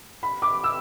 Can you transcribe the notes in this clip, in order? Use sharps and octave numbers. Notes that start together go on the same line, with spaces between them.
B5
D6
E6